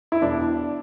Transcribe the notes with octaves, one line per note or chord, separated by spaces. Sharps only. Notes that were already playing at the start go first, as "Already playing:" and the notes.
E4
E1 D4